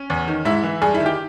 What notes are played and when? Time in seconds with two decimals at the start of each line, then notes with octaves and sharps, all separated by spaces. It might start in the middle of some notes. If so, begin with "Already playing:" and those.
Already playing: C#4
0.10 E2
0.28 D#3
0.45 G#2 E4 E5
0.64 E3
0.82 G2 G#4 G#5
0.94 E4 E5
1.00 D#3
1.06 G4 G5